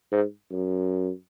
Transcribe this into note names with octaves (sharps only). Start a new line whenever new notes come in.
G#2
F#2